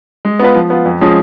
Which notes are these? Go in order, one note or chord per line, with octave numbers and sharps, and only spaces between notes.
G#3
B3 F4 B4
F3
B3 F4
F2
F3 G#3 C#4 G#4